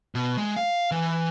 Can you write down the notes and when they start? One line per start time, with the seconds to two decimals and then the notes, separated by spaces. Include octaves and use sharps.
0.15 B2
0.37 G#3
0.56 F5
0.91 E3